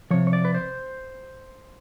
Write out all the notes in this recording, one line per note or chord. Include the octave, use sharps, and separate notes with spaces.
C3 F3 C#5
C#5
D5
B4
C5